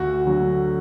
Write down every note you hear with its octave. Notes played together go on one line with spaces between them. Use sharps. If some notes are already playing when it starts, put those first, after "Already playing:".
Already playing: D2 F#4
D3 F#3 A3